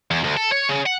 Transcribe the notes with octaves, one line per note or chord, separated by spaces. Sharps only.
E2
D2
A4
C#5
C#3
F#5